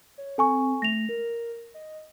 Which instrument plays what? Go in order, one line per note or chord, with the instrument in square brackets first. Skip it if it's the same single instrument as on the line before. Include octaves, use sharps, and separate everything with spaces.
[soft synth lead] C#5
[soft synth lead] C4 [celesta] A4 G#5 C#6
[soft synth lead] A3 [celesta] A#6 F7
[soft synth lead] A#4
D#5